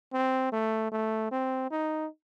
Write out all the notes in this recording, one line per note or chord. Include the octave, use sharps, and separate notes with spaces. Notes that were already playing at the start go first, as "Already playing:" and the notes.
C4
A3
A3
C4
D#4